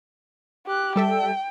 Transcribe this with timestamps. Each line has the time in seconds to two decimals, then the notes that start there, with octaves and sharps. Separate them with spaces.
0.67 G4 F#6
0.96 G3 A4 E5 G5